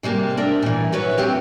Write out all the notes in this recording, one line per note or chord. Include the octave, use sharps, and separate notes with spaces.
C3 G3 G#3 A#3
D4 A#4 E5
A#2 E3
F#3 F#4 B4 C#5 E5
D2 C4 G4 F5